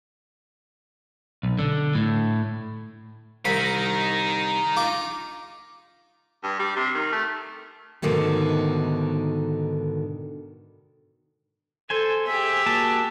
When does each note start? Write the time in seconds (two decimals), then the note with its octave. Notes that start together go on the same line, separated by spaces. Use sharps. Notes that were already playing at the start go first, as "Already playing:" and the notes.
1.43 B1
1.59 D3
1.95 A2
3.45 C2 D#4 A#4 B5
4.77 F4 D6
6.43 G2
6.60 G3
6.76 C3
6.94 D#3
7.12 A3
8.02 G#2 B2 D3 D#3 A3
11.90 A4 C5 G#5
12.27 G4 G#4 E5
12.66 A#3 F#4 A5